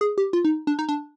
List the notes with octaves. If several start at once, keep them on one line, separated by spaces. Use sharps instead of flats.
G#4
G4
F4
D#4
D4
D#4
D4